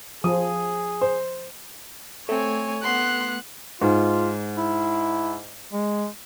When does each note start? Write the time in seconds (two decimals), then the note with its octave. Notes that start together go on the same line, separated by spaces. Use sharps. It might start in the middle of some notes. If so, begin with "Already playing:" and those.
0.24 F3 G#4 D#6
1.01 C5
2.29 A3 C4 C#5 G#5
2.83 B3 F#5 C6 F#6
3.82 G#2 F4
4.57 E4
5.73 G#3